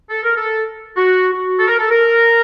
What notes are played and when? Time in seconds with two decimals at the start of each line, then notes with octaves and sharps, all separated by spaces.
0.10 A4
0.23 A#4
0.37 A4
0.97 F#4
1.32 F#4
1.59 A4
1.67 A#4
1.79 A4
1.90 A#4